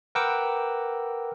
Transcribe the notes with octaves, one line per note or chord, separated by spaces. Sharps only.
A#4 B4 F#5 G5 D6 E6